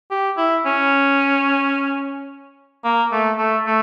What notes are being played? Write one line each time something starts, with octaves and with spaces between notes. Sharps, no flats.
G4
E4
C#4
A#3
A3
A3
A3